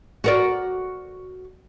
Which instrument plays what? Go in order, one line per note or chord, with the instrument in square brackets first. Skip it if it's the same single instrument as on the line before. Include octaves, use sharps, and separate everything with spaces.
[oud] F#4 A#4 D5